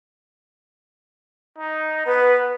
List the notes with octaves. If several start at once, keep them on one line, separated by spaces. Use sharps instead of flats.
D#4
B3 B4